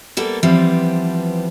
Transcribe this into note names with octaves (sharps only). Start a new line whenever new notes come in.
G3 A#3 B3 A4
E3 F3 G3 B3 C4